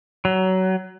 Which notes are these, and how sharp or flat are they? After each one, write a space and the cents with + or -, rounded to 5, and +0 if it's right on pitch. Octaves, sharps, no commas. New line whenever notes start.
F#3 +20